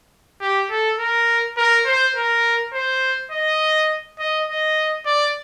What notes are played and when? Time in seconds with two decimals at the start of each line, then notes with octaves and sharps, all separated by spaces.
0.41 G4
0.70 A4
0.99 A#4
1.57 A#4
1.86 C5
2.15 A#4
2.74 C5
3.31 D#5
4.19 D#5
4.48 D#5
5.06 D5